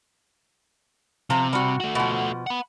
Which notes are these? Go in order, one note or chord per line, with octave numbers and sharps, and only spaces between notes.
C3 F3 A#5
G3 F#4
A3 F#4
B2 F3
F#5 B5